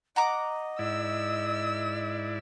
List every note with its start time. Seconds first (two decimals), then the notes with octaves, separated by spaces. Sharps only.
0.16 D#5 F#5 A#5 D6
0.79 G#2 E4 D5 E6